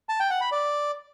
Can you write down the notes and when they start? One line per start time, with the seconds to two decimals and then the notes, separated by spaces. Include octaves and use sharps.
0.09 A5
0.20 G5
0.30 F#5
0.41 B5
0.52 D5